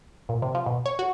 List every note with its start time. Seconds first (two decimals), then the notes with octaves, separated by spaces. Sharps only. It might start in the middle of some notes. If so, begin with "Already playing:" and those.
0.29 A#2
0.42 C3
0.55 F3
0.66 B2
0.86 C#5
0.99 F#4